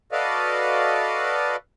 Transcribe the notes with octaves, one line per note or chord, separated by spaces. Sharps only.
F#4 A4 B4 D5 D#5 F5